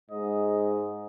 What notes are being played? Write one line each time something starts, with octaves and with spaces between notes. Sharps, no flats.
G#2 D#5